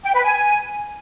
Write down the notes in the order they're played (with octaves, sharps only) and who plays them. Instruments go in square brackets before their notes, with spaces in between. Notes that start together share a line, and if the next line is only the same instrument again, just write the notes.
[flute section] G5
B4
G#5